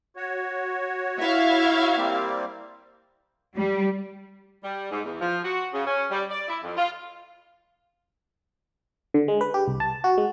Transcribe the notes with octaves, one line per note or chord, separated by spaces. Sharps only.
F#4 C#5
E4 E5 F5
G3 A#3 C4
G3
G3
G#2
E2
F3
F#4
C#3
C#4
G3
D5
E4
F2
F4
D3
G#3
B4
G4
C2
A5
F#4
G#3